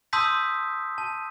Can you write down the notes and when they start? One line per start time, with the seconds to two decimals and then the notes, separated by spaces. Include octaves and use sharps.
0.13 A5 C6 D#6 E6 G6 B6
0.98 A5